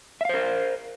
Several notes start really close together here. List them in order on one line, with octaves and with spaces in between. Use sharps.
E5 F5 C5 A#4